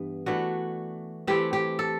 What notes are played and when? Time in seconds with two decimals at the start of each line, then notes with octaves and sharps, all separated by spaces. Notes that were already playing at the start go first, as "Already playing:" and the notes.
Already playing: G2 E3 B3
0.26 E3 A3 D4 F#4
1.27 E3 A3 C4 E4 G4
1.53 G4
1.79 A4